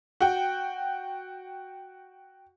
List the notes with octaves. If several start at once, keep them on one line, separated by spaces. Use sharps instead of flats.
F#4 G5